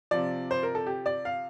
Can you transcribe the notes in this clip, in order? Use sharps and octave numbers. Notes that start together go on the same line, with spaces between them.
C3 F3 D5
C5
A#4
A4
G4
D5
F5